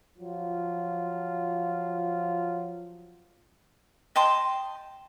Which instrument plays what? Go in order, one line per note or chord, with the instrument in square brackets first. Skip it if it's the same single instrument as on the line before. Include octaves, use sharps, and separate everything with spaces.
[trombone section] F3 F#3 F4
[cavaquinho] D#5 G5 A5 C6